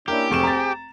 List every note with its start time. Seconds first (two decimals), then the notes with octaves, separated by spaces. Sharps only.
0.08 A#3 C#4 D4 E4 G4 A#4
0.31 F1 C4 G#4 G5 C#6 E7
0.43 A#5 A6